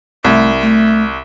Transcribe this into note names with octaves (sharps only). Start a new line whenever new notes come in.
C2 A3
A3